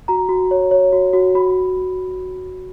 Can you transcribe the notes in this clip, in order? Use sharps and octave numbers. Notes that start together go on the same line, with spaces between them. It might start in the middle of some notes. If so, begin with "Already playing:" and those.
F#4 A#5
F#4
C#5
C#5
F#4
F#4
F#4 B5